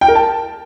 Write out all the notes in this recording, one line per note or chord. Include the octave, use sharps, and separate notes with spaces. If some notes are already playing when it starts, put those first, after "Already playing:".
G5
A#4
A5